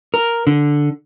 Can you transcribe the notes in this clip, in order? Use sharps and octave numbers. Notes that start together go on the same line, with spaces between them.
A#4
D3